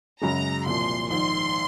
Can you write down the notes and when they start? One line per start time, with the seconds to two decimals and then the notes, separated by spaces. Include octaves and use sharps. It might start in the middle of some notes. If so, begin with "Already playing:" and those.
0.21 F#2 C#3 G#3 A#5
0.66 C2 A#2 F3 C6
1.10 A#1 G#2 D#3 C6